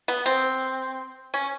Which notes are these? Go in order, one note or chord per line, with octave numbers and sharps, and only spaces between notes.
B3
C4
C#4